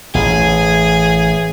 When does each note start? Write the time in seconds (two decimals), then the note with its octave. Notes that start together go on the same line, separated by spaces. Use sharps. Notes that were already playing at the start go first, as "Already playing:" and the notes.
0.15 A1 G#4